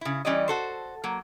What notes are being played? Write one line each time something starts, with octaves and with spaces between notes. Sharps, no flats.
C#3 E4
E3 G3 C#4 G4 D5 D#5
F#4 A4 C5
F#3 A#3